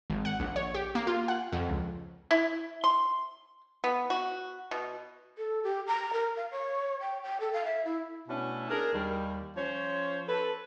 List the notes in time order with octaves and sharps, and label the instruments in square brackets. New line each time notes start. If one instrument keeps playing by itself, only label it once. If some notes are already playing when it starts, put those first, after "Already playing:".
[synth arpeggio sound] G#1
F#5
A#1
C#5
G4
A#3
F4
F#5
F2
C#2
[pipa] E4
C6
B3
F#4
B2
[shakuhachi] A4
G4
A#5
A#4
F5
C#5
G5
G5
A4
F5
E5
E4
[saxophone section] B2 A3 C#4 D4 E4
D4 G#4 A#4
D#2 G3
F3 C#4 C5 C#5
A4 B4